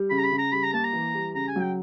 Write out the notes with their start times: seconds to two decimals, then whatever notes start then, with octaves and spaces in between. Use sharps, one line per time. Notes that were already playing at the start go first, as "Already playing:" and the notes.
Already playing: G3
0.10 C#3 B5
0.18 A#5
0.24 B5
0.32 C#3
0.38 A#5
0.52 G3 B5
0.63 A#5
0.73 A#3 A5
0.84 A#5
0.93 E3
1.15 G3
1.35 C#3 A#5
1.48 G#5
1.56 F#3
1.62 G5